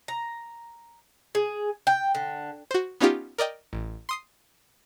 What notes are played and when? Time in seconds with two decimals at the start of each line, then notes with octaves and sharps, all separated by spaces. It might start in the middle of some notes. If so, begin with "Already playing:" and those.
0.08 A#5
1.35 G#4
1.87 G5
2.15 D3
2.71 F#4 C5
3.00 B3 C#4 D#4 F4 G4
3.38 A#4 D5 D#5 G5
3.73 A1
4.09 C6 D#6 C7